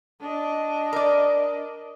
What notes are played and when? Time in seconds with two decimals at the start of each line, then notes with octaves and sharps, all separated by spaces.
0.21 D4 D#5
0.93 A#4 D5